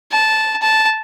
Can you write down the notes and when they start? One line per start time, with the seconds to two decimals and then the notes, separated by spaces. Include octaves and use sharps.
0.11 A5
0.62 A5